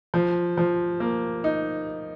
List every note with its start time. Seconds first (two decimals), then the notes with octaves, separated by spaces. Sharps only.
0.14 F3
0.57 F3
1.00 A#3
1.44 D#4